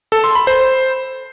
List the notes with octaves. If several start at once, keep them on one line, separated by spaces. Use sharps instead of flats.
A4
C6
B5
C5